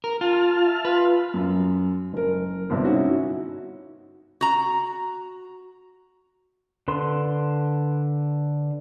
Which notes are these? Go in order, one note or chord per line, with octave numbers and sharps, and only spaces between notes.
A#4
F4 A5 F6
E5
F4 B4
F#2
F#1 A#4
G1 G2 C3
C#4 D#4 E4 F#4
F#4 A#5
D3 B4 C6